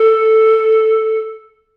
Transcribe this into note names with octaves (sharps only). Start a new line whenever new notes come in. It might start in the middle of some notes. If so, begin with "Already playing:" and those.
Already playing: A4